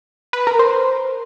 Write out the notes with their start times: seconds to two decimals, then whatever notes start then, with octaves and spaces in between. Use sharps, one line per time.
0.33 B4
0.47 A#4
0.59 C5